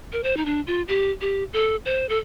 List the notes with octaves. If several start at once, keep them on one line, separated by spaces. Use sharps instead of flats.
A#4
C5
D#4
D4
F4
G4
G4
A4
C5
A4